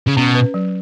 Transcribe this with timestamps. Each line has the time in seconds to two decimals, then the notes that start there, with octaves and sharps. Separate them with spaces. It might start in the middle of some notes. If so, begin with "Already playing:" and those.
0.07 C#3
0.17 B2 C#4
0.35 B4
0.54 F#3